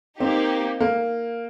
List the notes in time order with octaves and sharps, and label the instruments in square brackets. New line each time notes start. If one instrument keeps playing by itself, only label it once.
[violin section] A#3 D#4 G4 [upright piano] C4
[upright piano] A#3